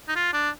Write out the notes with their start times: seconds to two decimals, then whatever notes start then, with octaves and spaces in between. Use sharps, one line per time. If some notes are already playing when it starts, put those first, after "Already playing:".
0.08 D#4
0.16 F4
0.33 D4